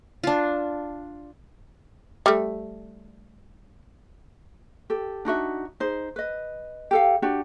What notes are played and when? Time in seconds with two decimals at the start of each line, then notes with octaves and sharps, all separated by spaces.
0.23 D4 F4
2.26 G3 A3
4.90 G4 A4
5.25 D4 D#4 F#4 E5
5.80 D#4 G#4 C5
6.16 B4 D#5
6.91 G4 A4 F5
7.22 D4 F#4 G4